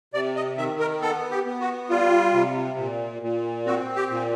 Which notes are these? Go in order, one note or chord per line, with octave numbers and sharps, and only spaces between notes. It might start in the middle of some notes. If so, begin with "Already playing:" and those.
C3 D5
D#5
D#3 E5
A#4
B3 A4
G4
B3
F#4
G3 F4
C3
A#2
A#2
C4 F#4
G4
A#2